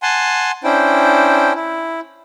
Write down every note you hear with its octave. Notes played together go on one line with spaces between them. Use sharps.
F#5 G#5 A5 C6
C#4 D4 E4 C5 G5
E4